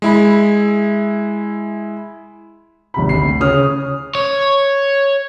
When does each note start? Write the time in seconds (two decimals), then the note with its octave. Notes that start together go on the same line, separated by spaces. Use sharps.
0.02 G#3 E4 B5
2.94 G#1 C3 B5
3.09 D2 C7
3.40 C#3 C#5 D#6 F6
4.15 C#5